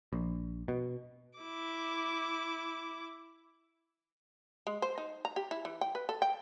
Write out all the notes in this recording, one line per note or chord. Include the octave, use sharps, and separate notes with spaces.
A#1
B2
E4 D6
G#3
C5
D#4
A#5
G4
E4
E3
G5
B4
A4
G5